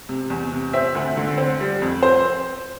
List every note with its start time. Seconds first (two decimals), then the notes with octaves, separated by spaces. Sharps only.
0.09 C3
0.30 E2
0.53 C3
0.73 C4 E5
0.95 D2
1.17 D3
1.38 C4
1.60 G3
1.82 F2
2.03 C4 C5